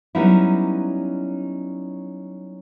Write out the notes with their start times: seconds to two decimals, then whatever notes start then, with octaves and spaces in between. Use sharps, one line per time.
0.15 F#3 G3 B3 C#4 D#4 E4